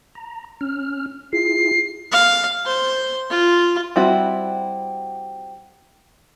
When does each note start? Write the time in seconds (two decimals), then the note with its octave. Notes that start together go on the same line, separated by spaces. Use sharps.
0.15 A#5
0.61 C#4 F6
1.33 E4 F4 G#4 C7
2.12 F5
2.65 C5
3.30 F4
3.96 G3 C4 E4 F#4